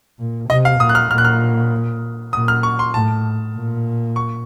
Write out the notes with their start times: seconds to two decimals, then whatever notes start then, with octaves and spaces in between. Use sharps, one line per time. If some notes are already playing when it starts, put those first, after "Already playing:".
0.19 A#2
0.49 C3 D#5
0.65 F5
0.79 A#2 D#6
0.89 F#6
0.95 F6
1.11 A#2 F6
1.18 F#6
1.25 F6
2.33 A#2 D#6
2.48 F6
2.63 C#6
2.79 C6
2.94 A2 A5
3.55 A#2
4.16 C#6